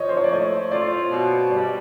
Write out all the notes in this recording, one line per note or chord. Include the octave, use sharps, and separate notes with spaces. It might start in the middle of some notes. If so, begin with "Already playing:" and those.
Already playing: F3 C#5 D#5
C5
C#5
D5
A3 C#5 D#5
F4 C5 D5
B2
G3 D5
D#5